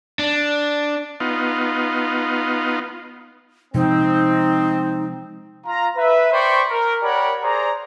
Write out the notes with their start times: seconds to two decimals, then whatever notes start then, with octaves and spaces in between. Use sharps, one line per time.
0.19 D4
1.20 B3 D#4 F4
3.75 C3 F3 G#3 C4 D#4
5.66 F4 A#5
5.97 B4 E5
6.33 C5 D5 G5 B5 C#6
6.70 A#4
7.02 G4 A#4 C#5 D5 F#5 B5
7.43 G#4 C5 D5 A#5